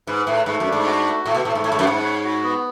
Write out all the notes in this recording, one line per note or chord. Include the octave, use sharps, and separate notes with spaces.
G#2 B4
A2 A3
G#2 A3
F#2
D4
G#2
F#4
A3
A2 A3
B2
A2 A3
G#2
A2 C#5
G#2
F#2
G#2 F#5
C#5
F#4
B3